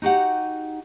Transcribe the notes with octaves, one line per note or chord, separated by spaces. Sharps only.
D#4 F#4 G4 F#5